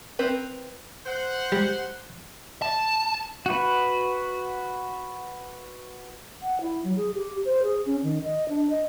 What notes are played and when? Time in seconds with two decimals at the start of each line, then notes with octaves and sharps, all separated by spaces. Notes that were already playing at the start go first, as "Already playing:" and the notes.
0.19 C4 A#4 B4
1.06 C5 F#5
1.52 G3
2.62 A5
3.46 F#4 B4
6.42 F#5
6.61 E4
6.84 F#3
6.97 G#4
7.14 G4
7.45 C5
7.63 G#4
7.86 C#4
8.03 D#3
8.24 D#5
8.49 D4
8.70 D#5